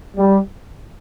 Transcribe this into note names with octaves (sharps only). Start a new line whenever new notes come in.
G3